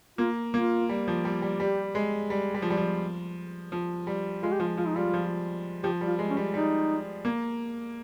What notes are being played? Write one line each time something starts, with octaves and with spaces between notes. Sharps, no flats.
A#3 F4
A#3 F4
G3
F3
G3
G3
G3 G4
G#3
G3
G3
F3
G3
F3
F3
G3
G#3 F4
G4
F3 F4
F3 F4
D#4
G3 F4
F3
F3 G4
G3
F4
G#3
C#4
G3
G3 D#4
A#3